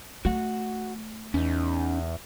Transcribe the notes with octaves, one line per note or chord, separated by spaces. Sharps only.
A3 F#4 F#5
E2 C#4 D#4